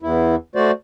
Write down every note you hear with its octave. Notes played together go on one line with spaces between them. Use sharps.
E2 E4
A3 F#4 C5 D5